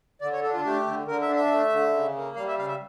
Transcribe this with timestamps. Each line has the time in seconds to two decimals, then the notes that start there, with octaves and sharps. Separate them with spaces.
0.21 D3 D5
0.33 C#5
0.43 D4 A4
0.53 F4
0.65 A3 G4
0.86 D3
1.07 D3 A#4
1.22 E5
1.28 D4
1.36 E5
1.51 A3
1.73 D3
1.93 C#3
2.15 A#3
2.36 G3 F5
2.48 E5
2.58 C#3 F5
2.68 E5